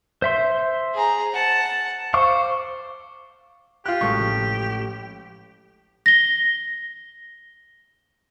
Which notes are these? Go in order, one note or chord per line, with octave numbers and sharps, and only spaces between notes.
C5 E5 C6
G#4 A#5
F#5 A5
C5 F5 C#6 D6
F4 G4 F#6
A1 C3 G#3 F#4 C#6
F3
A#6 G7